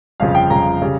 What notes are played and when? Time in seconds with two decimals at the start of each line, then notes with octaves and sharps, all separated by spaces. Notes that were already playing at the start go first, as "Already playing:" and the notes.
0.20 G1 F2 C#3 F3 F5
0.35 G5
0.50 G1 F2 C#3 F3 A#5
0.82 C#3 G3